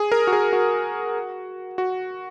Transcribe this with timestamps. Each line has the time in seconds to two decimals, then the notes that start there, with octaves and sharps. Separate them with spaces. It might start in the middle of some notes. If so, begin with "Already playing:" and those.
Already playing: G#4
0.12 A#4
0.27 F#4
0.33 G#4
0.53 F#4
1.78 F#4